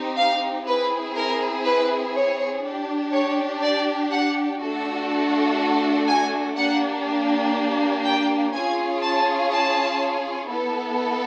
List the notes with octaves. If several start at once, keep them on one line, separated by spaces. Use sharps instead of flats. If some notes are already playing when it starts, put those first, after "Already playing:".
Already playing: C4 D#4 G4
F5
C4 E4 G#4 B4
A#4
B4
C#5
D4 G4
C#5
D5
F#5
A3 D4 F#4 A4
G#5
A#3 D4 G4 F#5
G5
C#4 F4 G#4 G#5
A5
A5
B3 E4 A4